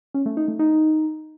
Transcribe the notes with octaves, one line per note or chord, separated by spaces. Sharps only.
C#4
A3
D#4
A3
D#4